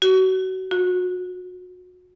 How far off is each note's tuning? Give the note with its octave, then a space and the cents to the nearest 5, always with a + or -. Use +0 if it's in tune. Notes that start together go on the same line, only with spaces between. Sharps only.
F#4 +25
F#4 -30